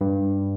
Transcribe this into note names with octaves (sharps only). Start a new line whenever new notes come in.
G2